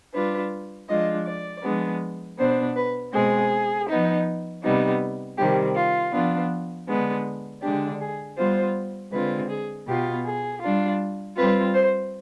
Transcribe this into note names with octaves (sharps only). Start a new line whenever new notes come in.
G3 D4 F4 B4
F3 G#3 D4 F4 D#5
D5
F3 G#3 B3 D4
B2 B3 D4 C5
B4
B2 G#3 C4 G#4
F3 B3 D#4
C3 G3 B3 D#4
C3 D#3 G3 C4 G4
F4
F3 B3 D4 F4
D3 G#3 B3 D4
D3 G#3 D4 G4
G#4
G3 B3 F4 C5
D3 G#3 C4 F4 B4
G#4
B2 B3 F4 G4
G#4
G3 D4 F4
G3 C4 F4 B4
C5